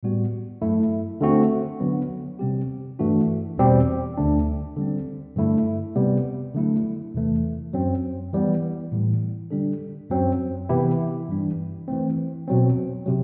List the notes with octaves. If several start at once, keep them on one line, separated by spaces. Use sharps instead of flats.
A2 G3 B3 F#4
G2 F#3 A3 E4
D3 A3 C4 F#4
D3 F#3 B3
C3 G3 C4 G4
G2 E3 A3 D4 F#4
E2 B2 G3 C4 G4
D2 D3 A3 D4
D3 G3 C4
G2 D3 A3 E4
C3 G3 B3
D3 F#3 A3 E4
E2 C3 E3 A3
F#2 F#3 C4
E3 G3 B3
A2 E3 G3
D3 G3 D4 A4
F#2 F#3 C4
C3 E3 B3 E4 G4
G2 E3 G3 D4
E3 A3 C4
B2 F#3 C4
C3 F#3